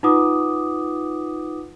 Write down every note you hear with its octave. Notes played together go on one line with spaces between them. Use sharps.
D#4 F4 B4 F#5 D6 D#6